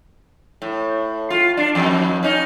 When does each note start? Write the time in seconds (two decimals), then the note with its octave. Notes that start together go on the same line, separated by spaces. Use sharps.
0.62 A2
1.30 F4
1.57 D4
1.75 F2 D#3
2.23 C#4 D#4